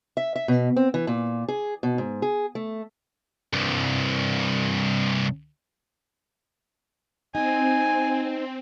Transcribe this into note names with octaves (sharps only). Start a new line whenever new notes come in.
E5
E5
B2
C4
E3
A#2
G#4
B2
G#2
G#4
A3
C2 G2
C4 D#4 G#5